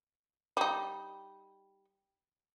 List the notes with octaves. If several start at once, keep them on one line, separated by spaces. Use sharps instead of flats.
G3 D#4